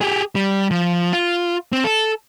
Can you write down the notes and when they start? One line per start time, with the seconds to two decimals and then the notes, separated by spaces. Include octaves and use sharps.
0.01 G4 G#4
0.35 G3
0.71 F3
1.13 F4
1.72 C4
1.84 A4